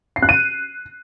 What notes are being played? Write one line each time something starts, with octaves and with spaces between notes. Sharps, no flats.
C7
F#6
D#7